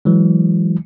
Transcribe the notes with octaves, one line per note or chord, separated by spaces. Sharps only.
E3 F#3 G#3